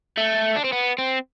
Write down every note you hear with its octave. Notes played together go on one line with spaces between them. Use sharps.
A3
D4
C4
B3
C4